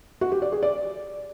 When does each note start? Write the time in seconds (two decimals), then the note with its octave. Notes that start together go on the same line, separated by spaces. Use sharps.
0.21 F#4
0.32 G4
0.42 D5
0.52 G#4
0.63 D5